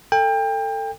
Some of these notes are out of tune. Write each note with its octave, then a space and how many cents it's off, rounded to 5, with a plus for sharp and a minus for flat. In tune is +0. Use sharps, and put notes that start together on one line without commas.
A4 +20 G5 +30